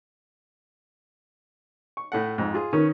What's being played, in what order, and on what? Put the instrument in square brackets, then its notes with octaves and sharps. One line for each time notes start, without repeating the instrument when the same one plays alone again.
[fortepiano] C#6
A2 A3 F#5
F2 G#2
F4 G#4
[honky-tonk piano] D#3 [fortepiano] C#4 B4